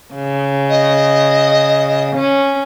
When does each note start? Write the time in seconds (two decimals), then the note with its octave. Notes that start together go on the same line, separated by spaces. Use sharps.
0.14 C#3
0.69 D#5
2.16 C#4